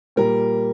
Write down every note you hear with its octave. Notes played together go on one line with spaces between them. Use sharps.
A#2 G3 A#4